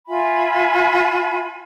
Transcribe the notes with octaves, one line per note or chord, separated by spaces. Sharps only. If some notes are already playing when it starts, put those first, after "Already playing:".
F4 E5 G#5 B5